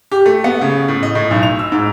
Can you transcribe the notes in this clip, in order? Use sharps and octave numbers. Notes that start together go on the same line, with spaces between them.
G4
A3
B3
C#3
A2
D#5
A2
B1
F7
E6
G#2